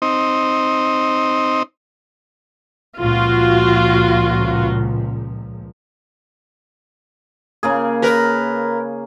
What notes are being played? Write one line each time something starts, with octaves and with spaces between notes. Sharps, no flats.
C4 D#4
C#2 A#2 F3 F4 F#4
C#3 A#3 G#4
A#4 B4